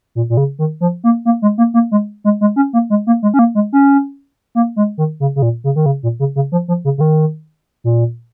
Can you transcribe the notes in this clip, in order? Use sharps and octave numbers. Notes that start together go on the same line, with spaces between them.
A#2
A#2
C#3
D#3
F3
A#3
A#3
G#3
A#3
A#3
G#3
G#3
G#3
C#4
A#3
G#3
A#3
G#3
C#4
A#3
G#3
C#4
A#3
G#3
D#3
C#3
C#3
A#2
C#3
D#3
C#3
A#2
C#3
C#3
F3
F3
C#3
C#3
D#3
A#2